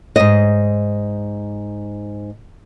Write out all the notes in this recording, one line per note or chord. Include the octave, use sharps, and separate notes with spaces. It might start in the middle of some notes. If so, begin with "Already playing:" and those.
G#2 D#5